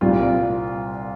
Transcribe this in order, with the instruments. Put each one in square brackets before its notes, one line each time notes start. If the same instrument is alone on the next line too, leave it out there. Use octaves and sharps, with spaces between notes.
[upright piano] C2 A#2 G3 C4 F4